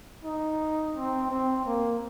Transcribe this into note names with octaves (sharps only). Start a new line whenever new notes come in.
D#4
C4
C4
A#3